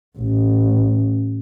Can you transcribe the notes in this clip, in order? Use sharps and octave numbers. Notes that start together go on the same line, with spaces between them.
A1